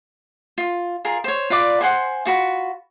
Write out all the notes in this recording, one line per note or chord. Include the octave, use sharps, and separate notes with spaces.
F4
F4 G#4 A#4
C5 C#5
F4 B4 D5 D6
C5 F#5 G#5 C6
F4 F#4 B5